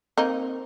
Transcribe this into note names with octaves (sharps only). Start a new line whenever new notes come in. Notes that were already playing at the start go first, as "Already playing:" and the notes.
A#3 C4 D#4